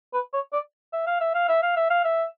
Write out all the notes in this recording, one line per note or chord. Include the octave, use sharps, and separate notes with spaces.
B4
C#5
D5
E5
F5
E5
F5
E5
F5
E5
F5
E5